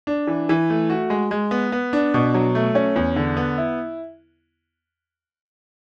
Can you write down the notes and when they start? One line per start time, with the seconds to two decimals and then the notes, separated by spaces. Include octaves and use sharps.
0.07 D4
0.27 E3
0.49 E3
0.70 A3
0.90 F#4
1.10 G#3
1.31 G#3
1.51 B3
1.72 B3
1.93 D4
2.14 B2
2.34 F#3
2.55 A3
2.75 C#4
2.96 E2
3.16 D3
3.37 B3
3.58 E4